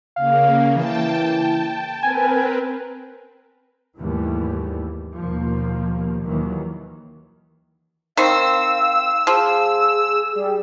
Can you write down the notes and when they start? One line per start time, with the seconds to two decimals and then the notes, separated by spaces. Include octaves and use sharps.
0.16 C#3 A#3 F5
0.76 E3 G5 A5
2.03 C4 A#4 B4 G#5
3.98 D#2 G#2 E3 G3 A3
5.16 D#2 B2 F3 A#3
6.22 D#2 D#3 E3 F#3
8.17 D#3 C4 F5 E6
9.27 F3 G#4
10.35 G3 G#4